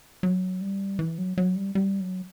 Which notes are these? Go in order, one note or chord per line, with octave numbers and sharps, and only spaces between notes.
F#3
G3
E3
F#3
F#3
G3
G3
F#3